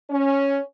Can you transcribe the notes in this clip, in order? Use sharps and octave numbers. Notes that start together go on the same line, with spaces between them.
C#4